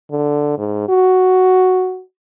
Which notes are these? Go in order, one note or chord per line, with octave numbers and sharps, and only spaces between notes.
D3
G#2
F#4